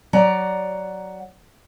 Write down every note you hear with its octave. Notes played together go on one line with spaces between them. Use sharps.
F#3 D5 F#5 A#5